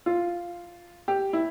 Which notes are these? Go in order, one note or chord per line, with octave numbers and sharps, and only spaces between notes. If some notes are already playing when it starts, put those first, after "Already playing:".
F4
G4
E4